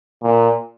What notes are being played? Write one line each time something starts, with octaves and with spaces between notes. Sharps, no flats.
A#2